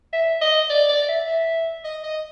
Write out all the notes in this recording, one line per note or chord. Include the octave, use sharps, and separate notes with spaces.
E5
D#5
D5
D5
E5
E5
D#5
D#5